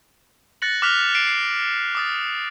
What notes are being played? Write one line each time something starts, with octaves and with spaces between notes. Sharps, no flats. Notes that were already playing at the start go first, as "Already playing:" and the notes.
F#6 A6 A#6 C#7 F#7
D6 F6 F#6 B6 F7
C7 D7 E7
C7
D6 D#6 A6